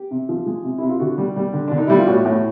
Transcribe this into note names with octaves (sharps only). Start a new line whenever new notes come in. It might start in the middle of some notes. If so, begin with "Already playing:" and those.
Already playing: G4
C3
F3
G#3
C3
C3 E4
F4
D3 F#4
G3
G3
D3
D3 D4
D#4
G3 E4
F4
A2 F#4
A2